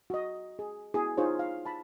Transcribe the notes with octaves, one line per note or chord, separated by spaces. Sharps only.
F#4 D#5
G#4
B3 E4 F#4 G#4
D#4 F4 G#4 C5 C#5
F5
A5 B5